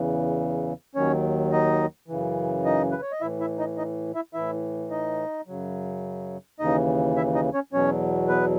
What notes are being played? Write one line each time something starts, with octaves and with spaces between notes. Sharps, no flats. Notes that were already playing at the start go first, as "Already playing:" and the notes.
Already playing: E2 C#3 E3
D#2 D#3 F#3 C#4 C#5
D#4 D#5
F#2 C#3 E3
D#4 D#5
B4
C#5
D#5
A2 E3 E4 E5
E4 E5
D#4 D#5
D#4 D#5
E4 E5
A2 E3 E4 E5
D#4 D#5
F#2 C#3 F#3
D#2 C#3 E3 D#4 D#5
E4 E5
D#4 D#5
C#4 C#5
E2 B2 F#3 C#4 C#5
B3 B4